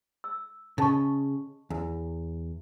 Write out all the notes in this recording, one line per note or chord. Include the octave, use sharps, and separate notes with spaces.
E6
C#3 D#5 A5 C#6
E2